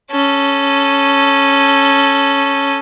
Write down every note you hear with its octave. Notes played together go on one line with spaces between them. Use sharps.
C#4 A4